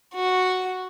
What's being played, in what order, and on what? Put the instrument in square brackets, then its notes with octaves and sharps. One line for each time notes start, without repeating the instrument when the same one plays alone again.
[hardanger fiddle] F#4